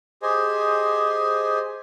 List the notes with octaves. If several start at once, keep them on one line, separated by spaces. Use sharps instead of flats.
G4 G#4 C5 D#5 G#5